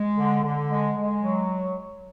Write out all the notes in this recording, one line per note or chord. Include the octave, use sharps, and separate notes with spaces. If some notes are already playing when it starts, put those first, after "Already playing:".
Already playing: G#3
D3
D3
G#3
G#3
F#3